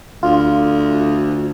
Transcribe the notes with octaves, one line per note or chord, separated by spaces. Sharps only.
D2 F4